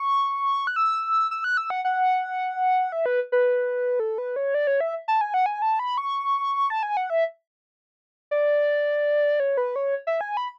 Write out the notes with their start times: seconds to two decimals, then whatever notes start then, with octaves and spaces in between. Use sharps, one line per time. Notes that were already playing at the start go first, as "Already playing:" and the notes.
Already playing: C#6
0.67 F#6
0.76 E6
1.31 E6
1.44 F#6
1.57 E6
1.70 F#5
1.85 F#5
2.92 E5
3.06 B4
3.32 B4
4.00 A4
4.18 B4
4.36 C#5
4.54 D5
4.67 C#5
4.81 E5
5.08 A5
5.21 G#5
5.34 F#5
5.46 G#5
5.62 A5
5.79 B5
5.98 C#6
6.70 A5
6.83 G#5
6.97 F#5
7.10 E5
8.31 D5
9.40 C#5
9.57 B4
9.76 C#5
10.07 E5
10.21 G#5
10.37 B5